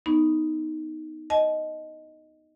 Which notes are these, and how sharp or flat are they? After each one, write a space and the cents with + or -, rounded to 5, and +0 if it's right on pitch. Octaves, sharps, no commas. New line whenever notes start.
B3 +0 D#4 +0 C#6 +0
D#5 +0 A5 -35